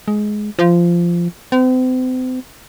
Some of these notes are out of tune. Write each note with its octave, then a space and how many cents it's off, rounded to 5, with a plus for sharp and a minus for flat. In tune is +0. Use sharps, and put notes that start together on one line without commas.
G#3 +15
F3 -15
C4 -40